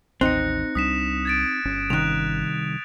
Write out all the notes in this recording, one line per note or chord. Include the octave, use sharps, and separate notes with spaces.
A1 D#2 C4 D#4 F#6 A#6 C#7
C2 G3 D4 D#6 B6 E7
G#6 A6 D7
G1 C#4
C2 D#3 F#6 F7